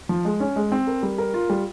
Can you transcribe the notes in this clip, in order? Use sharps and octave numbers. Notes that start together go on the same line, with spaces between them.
F3
G#3
C#4
G#3
C4
A#4
G3
A#4
F4
G3